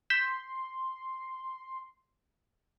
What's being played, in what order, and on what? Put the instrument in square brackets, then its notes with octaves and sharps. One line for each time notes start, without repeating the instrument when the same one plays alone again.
[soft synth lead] C6 [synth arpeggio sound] G6 B6 E7